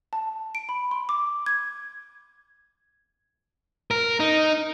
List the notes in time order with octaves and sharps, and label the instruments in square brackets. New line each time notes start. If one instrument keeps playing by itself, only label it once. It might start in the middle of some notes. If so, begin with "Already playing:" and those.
[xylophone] A5
D7
B5
C6
D6
G#6
[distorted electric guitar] A#4
D#4